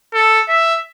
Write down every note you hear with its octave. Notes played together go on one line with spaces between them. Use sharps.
A4
E5